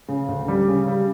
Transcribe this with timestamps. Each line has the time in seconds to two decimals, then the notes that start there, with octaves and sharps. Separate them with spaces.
0.08 C#3
0.28 D2
0.48 G3
0.68 C#3
0.88 G3